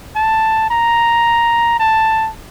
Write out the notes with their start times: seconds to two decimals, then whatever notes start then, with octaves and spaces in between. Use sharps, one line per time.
0.16 A5
0.70 A#5
1.80 A5